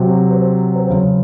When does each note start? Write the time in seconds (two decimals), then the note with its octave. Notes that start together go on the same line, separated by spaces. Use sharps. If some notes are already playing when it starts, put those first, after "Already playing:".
Already playing: C3 F#3
0.31 C5
0.75 C5
0.90 C#3 F#3